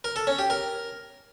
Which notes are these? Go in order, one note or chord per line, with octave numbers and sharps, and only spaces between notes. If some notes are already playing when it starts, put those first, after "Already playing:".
A#4
A4
C#4
G4
A#4